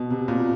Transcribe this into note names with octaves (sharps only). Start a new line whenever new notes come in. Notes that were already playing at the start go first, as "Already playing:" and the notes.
Already playing: B2
C3
A#2